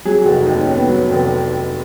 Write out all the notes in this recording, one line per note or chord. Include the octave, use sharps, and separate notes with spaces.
F#3 G#4
F#4
F1
D#4
D#2 D#4
C#4
D#3
B3
F#3
F1